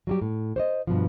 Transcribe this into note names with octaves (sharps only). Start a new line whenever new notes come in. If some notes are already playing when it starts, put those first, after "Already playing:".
F#3 G3 G4
A2
C5 C#5 D#5
G2 B2 F3